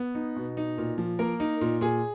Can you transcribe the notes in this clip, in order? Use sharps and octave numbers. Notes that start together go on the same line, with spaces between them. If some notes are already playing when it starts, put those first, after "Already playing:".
Already playing: B3
D#4
B2
D#4
A#2
F3
A#3 A#4
D#4
A#2
A#2 G#4